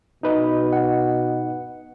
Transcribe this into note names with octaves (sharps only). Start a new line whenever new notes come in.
B2 D#4 B4 D#5
F#5